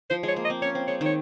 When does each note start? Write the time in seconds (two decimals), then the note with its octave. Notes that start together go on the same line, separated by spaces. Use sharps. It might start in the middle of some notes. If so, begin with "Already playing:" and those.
0.10 F3 C5
0.23 G#3 C#5
0.36 A#3
0.45 D#5
0.50 C4
0.62 C#4 C#5
0.75 C4
0.87 G#3 C#5
1.01 D#3 C#5